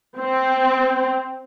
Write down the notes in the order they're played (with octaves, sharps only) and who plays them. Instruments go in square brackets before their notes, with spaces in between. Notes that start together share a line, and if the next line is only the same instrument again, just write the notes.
[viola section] C4